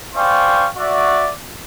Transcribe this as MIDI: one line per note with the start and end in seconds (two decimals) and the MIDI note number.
0.15 0.68 72
0.15 0.68 74
0.15 0.68 77
0.15 0.68 79
0.15 0.68 80
0.15 0.68 85
0.77 1.31 66
0.77 1.31 74
0.77 1.31 76